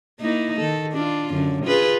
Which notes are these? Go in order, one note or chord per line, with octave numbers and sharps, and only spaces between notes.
A#3 D#4 E4
D#3 A4
D4 F4
F#2 D3
F4 G#4 B4